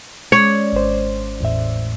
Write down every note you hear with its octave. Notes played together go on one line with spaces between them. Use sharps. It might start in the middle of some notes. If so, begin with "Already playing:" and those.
G#3 C#4 C#5 D5
G#1 C5
E2 A2 E5